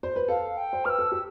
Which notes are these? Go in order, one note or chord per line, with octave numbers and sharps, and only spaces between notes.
C5
B4
A4 F5
G5
C5
B4 E6 F6
A4
G4 E6